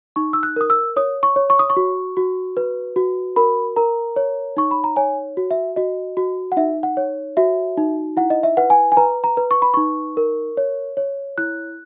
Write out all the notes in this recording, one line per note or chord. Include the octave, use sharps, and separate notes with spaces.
D#4 C#6
E6
F#6
A#4 D#6
E6
C#5 D#6
C#6
C#5
C#6
D#6
C#6
F#4
F#4
B4
F#4
A#4 B5
A#4 A#5
C#5
D#4 C#6
B5
A#5
C#5 G#5
F#4
E5
F#4 D#5
F#4
F#5
D#4 E5
F#5
C#5
F#4 E5
D#4
E4 F#5
D#5
E5
B4 F#5
G#5
G#5
B4 A#5
A#5
B4
C#6
B5
D#4 C#6
A#4
C#5
C#5
E4 F#6